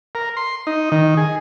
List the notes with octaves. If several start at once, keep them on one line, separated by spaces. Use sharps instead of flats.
A#4
C6
D#4
D#3
G#4